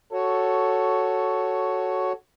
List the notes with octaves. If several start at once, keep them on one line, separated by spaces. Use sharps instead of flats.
F#4 A4 C#5